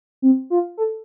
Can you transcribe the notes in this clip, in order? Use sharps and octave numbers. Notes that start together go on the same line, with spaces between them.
C4
F4
A4